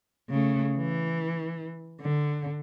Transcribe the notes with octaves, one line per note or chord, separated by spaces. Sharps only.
C#3 A3
E3
D3